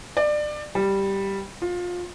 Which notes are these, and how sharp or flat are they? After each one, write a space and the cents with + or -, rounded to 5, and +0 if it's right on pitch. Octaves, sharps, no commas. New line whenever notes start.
D5 +25
G3 +0
F4 +25